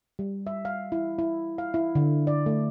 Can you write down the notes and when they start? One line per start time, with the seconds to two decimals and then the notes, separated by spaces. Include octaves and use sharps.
0.19 G3
0.47 E5
0.65 F5
0.92 E4
1.19 E4
1.58 F5
1.74 E4
1.95 D3
2.27 D5
2.46 A3